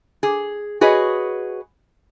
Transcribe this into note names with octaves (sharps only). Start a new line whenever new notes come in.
G#4
F#4 G#4 B4 C#5 D#5